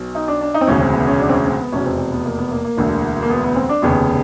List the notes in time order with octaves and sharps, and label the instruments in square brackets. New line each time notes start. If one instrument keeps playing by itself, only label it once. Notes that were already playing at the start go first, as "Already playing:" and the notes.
Already playing: [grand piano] B1 B2
D#4
D4
D4
D#4
C4
E1 D2 C#3 C#4
C4
B3
C#4
D4
C4
C#4
C4
B3
F1 E2 B2 C#4
C4
C4
B3
A#3
B3
A#3
A#3
E1 D2 D3
A#3
B3
B3
C4
D4
F1 D#2 C#3 B3